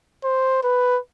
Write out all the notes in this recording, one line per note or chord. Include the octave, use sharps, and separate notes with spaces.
C5
B4